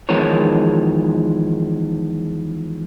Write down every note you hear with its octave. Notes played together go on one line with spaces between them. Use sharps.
E2 D#3 F3 G#3 A#4 C#5